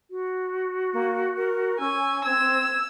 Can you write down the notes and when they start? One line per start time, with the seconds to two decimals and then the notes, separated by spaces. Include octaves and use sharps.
0.11 F#4
0.93 A#3
1.37 A#4
1.80 C#4 G#5 E6
2.25 C4 E6 G#6